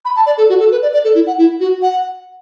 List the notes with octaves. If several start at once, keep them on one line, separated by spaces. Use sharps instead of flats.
B5
A5
D5
A4
F#4
A4
B4
D5
D5
A4
E4
F#5
E4
F#4
F#5